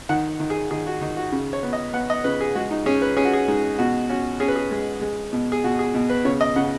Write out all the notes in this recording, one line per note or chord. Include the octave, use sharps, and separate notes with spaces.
D#3 F#5
D#3
G#4
D#3 G#4
F#4
D#3 D#4
F#4
C#3
C#5
B3
D#5
B3 F#5
D#5
C#3 B4
G#4
G#3 F#4
D#4
C#4 G#4
B4
C#4 G#4
F#4
G#4
G#3 D#4
B2 F#4
C#4 F#4
C#4 G#4
B4
G#4
G#3
G#3
B2
G#4
B2 F#4
G#4
B2
B4
C#3 C#5
D#5
C#3 F#5